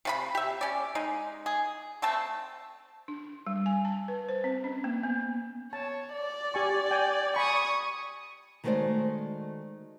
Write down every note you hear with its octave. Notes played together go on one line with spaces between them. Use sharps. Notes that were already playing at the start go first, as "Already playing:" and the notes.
C3 F4 B5
G4 E5
C#4 D5
G#3 D#4
G#4
A3 C4 A5
D4
G3
G#5
A5
B4
C5
C4
C#4
A#3
B3
C#5 A5
D5
G4 G#5 C#6
G5 G#5
G#5 B5 C#6 D#6
D#3 G#3 A3 F#4 C5 D5